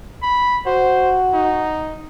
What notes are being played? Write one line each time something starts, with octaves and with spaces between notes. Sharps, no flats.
B5
F#4 C5
D#4